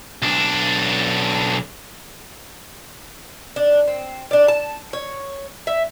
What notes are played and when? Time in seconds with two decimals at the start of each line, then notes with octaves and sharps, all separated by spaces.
0.22 B1 D4
3.56 D4
3.88 C4
4.31 D4 D5
4.48 A5
4.93 C#5
5.67 E5